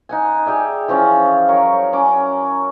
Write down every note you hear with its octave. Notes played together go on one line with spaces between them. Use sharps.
D#4 F#5 G#5
G4 G#4 D5 E5
E3 F3 C#4 F5
F#3 A#4 C#5
C#4 D6